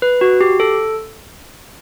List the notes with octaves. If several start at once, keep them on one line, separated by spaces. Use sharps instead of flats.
B4
F#4
G4
A4